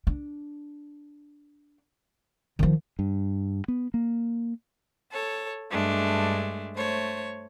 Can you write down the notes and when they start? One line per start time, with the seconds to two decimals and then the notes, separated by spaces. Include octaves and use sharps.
0.07 D4
2.59 D#3 F3
2.99 G2
3.68 B3
3.94 A#3
5.12 A4 C#5
5.70 G2 G#3 A3 D4
6.75 A3 C5 C#5